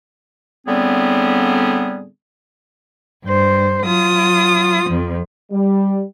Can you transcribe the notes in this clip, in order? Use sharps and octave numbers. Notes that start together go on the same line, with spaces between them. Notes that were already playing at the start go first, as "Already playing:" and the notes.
A2 D3 G3 B3 C4 G#4
G2 C5
F#3 F4 D#6
F2 F3
G3